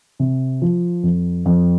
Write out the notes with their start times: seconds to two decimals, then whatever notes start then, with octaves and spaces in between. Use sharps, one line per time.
0.19 C3
0.62 F3
1.03 F2
1.45 F2